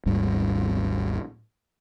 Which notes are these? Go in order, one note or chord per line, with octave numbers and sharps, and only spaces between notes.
G#1 D#2 G#2 G3